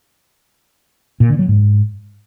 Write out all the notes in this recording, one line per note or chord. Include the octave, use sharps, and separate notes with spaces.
A#2
D3
F#3
G#2